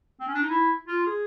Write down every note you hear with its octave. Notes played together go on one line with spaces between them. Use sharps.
C4
C#4
D4
D#4
E4
F4
G#4